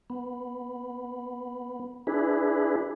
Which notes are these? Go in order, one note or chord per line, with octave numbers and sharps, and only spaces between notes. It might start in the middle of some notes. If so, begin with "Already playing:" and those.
B3
D4 E4 G#4 B4